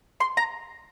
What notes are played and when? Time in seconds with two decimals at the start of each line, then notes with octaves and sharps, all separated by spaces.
0.20 C6
0.37 A#5